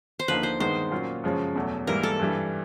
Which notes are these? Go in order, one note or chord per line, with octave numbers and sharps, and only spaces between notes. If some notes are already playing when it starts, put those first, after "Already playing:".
C5
D#2 D3 F3 A#3 D#4 B4
C5
G2 D#3 G#3 B3 D#4 C5
A#2 F#3 A#3 C#4 F4
F#2 C#3 F3 G#3 C#4
E2 B2 F#3 A3
G#2 E3 G3 A#3 A#4
A4
G2 E3 G3